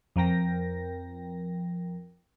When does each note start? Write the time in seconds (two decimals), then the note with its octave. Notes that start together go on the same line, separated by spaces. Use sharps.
0.16 F2 F3 A#4 G5 A#6